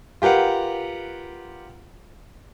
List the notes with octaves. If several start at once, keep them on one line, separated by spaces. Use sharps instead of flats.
F4 G4 A#4 B4 F#5